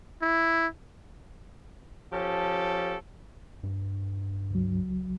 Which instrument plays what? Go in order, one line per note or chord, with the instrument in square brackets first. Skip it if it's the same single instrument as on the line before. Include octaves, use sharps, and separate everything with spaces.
[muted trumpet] E4
[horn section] F3 C#4 G4 A4
[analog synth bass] G2
[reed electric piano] C#2 F#3